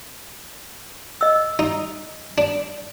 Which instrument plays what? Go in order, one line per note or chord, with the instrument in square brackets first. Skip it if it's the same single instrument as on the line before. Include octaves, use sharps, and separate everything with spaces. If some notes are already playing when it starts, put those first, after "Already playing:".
[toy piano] D#5 E6
[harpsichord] D#4
D4